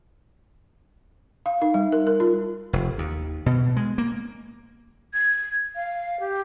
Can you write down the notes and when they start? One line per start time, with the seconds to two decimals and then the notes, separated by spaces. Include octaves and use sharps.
1.46 F5
1.62 D#4
1.74 G3
1.92 A#4
2.07 A#4
2.20 F4
2.73 F1
2.98 D#2
3.46 B2
3.77 G#3
3.98 A#3
5.14 G#6
5.75 F5
6.20 G4